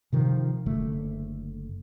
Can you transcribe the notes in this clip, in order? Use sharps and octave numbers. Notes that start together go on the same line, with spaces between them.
C3 D#3 F3
F#1 D3 A3